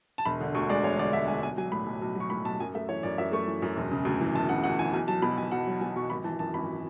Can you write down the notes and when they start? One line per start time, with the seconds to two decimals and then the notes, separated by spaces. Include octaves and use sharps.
0.18 A5
0.25 E1 B5
0.41 D3
0.55 D2 C#6
0.69 G#3 D5
0.84 E1 C#5
0.99 D3 D5
1.13 D2 E5
1.28 G#3 G#5
1.43 B1 G#5
1.57 F#3 G#5
1.72 A2 B5
1.86 B1
2.01 B1
2.16 F#3 C#6
2.30 A2 B5
2.45 B1 A5
2.60 F#2 G#5
2.74 A3 E5
2.89 E3 C#5
3.03 F#2 D5
3.18 F#2 E5
3.32 A3 C#6
3.47 E3
3.62 F#2
3.76 E1
3.91 C#3
4.05 D2
4.21 E3
4.34 E1 A5
4.49 C#3 F#5
4.64 D2 F#5
4.79 E3 G#5
4.93 B1 G#5
5.08 F#3 A5
5.22 B2 B5
5.37 B1 G#5
5.51 B1 F#5
5.67 F#3
5.81 B2 G#5
5.96 B1 C#6
6.10 G#1 B5
6.24 E3 A5
6.39 F#2 A5
6.54 G#1 B5